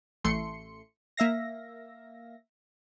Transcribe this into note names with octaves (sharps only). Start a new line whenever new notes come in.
A1 A3 C6 C#7
A#3 E5 F5 A#6